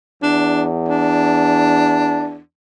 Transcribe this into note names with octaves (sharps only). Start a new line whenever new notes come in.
E2 D4
D4